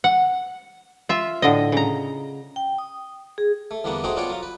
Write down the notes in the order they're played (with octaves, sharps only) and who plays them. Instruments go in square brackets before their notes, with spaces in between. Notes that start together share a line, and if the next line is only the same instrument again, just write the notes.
[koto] F#5
F4 E5
A2 D3 D#5
C#3 A#5
[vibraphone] G5
D#6
G#4
[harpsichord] A3
E2 D3 G3 A#3 B3 D4
A3 D#4 F#4 G#4 C5 G5
B3 D4 F4 C#5 D5 G5
F#3 F4
B4